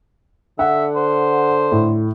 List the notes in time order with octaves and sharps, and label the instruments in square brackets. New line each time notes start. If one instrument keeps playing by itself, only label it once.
[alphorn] D3 [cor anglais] E5 [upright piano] F#5
[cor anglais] C5
[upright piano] A2